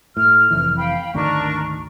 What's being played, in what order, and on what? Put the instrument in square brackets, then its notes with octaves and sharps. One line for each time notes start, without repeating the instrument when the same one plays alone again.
[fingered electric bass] A2 [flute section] F6
[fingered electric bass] F1 E3
[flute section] F5 G5 B5
[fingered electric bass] G#1 D2 D#3 [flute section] D4 A#4 C#6